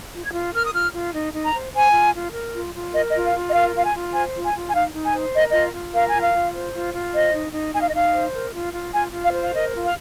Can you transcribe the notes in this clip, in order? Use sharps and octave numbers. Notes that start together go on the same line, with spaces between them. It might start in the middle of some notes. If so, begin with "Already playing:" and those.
F4
G#6
F4
A#4 F6
D#6
F4 F6
F4
D#4
D#4
A#5
C5
C5 G#5
F4
F4
A#4
F4
F4
A#4 D#5
D#5
F4
F5
F4
D#5
A#4 F5
F4 F5
G#5
F4
C5 G#5
F4
G#5
F4
G#5
D#4 F5
D#4
G#5
C5
A#4 D#5
F4 D#5
F4
A#4 F5
G#5
F4
F5
F4
C5
F4
F4
C5 D#5
D#4
D#4
D#4 G#5
F5
D#5
D#4 F5
C5
A#4
F4
F4
F4 G#5
F4
F5
C5
F5
A#4 D#5
F4
F5